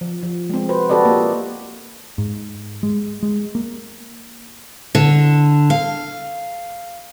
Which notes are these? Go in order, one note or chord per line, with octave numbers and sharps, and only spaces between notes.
F3
F3
G#3 C4
F#4 B4 C5
F#4 G4 A4 B4 D5 D#5
A#3 F4
G#2
G#3
G#3
A#3
D3
F5